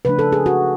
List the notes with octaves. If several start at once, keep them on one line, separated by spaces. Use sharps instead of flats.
C#3 F3 A3 D4 B4
A4
G#4
F#4